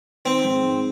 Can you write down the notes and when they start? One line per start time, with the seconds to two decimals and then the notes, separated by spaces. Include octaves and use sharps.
0.25 D#3 C4
0.45 G#2
0.64 G#2